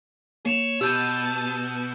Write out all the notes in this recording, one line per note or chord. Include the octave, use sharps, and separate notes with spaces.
A#3 C#5 C7 E7 F7
B2 G4 A5 E6 G6 D#7